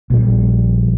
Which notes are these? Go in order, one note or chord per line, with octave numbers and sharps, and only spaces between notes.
A#1 G3